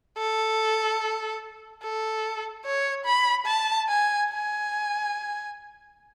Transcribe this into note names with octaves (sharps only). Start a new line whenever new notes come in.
A4
A4
C#5
B5
A5
G#5
G#5